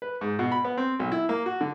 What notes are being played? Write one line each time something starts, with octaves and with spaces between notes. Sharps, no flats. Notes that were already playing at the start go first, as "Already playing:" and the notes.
B4
G#2
B2
B5
B3
C4
B1
E4
A#3
F#4
D3